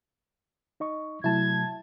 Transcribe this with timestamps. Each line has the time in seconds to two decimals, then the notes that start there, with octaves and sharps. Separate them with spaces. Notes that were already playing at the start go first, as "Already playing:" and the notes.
0.80 D#4 D#5 C#6
1.24 C3 F#3 A3 E4 A5 G#6